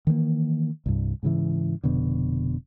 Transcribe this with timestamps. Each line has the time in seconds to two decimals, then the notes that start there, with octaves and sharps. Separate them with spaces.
0.07 D#3 E3 G3 A#3
0.86 C2 G2
1.23 G#2 C#3 E3
1.84 F1 F2 B2 D3